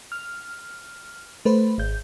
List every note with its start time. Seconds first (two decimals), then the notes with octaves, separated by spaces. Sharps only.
0.12 F6
1.45 A3 B4 C5
1.78 G#1 G6